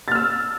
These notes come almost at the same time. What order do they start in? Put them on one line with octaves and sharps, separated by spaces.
A6 F6 E6